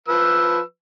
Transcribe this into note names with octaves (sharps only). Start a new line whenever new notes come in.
F3 B4 E6